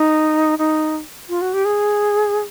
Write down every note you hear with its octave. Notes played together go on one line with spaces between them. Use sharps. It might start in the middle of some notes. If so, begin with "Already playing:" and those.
Already playing: D#4
D#4
F4
F#4
G4
G#4